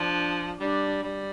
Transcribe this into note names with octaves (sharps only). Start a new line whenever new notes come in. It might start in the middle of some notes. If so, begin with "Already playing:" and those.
Already playing: F3 D4
G3 D4
G3